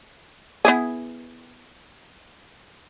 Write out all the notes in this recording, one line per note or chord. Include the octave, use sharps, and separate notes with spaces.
B3 E4 G#4